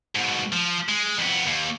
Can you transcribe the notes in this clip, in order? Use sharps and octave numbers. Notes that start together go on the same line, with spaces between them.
G#2 B2
F3
G#3
F2 B3
D#2